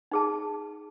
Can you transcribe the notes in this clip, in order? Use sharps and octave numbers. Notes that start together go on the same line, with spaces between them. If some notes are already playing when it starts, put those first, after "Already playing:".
D#4 G#4 A5